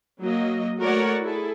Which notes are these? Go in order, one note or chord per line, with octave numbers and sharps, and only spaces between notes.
F#3 A#3 D#5
A3 F#4 A#4 C#5 D5 F#5
E4 G#4 A4